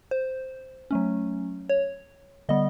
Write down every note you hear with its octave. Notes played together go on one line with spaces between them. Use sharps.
C5
F#3 A3 C#4
C#5
D3 G3 B3 D#5